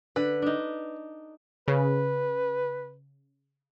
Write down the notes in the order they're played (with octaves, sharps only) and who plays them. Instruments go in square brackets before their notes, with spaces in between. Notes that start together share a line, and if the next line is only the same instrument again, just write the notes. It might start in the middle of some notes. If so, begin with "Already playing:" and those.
[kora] D3 [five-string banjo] B4
[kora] D4 D#4
[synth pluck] C#3 [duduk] B4